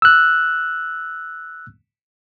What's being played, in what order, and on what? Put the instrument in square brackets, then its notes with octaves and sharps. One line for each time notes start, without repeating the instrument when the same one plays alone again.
[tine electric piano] E6 F#6